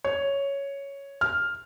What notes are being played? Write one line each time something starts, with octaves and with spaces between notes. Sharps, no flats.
C#5
F6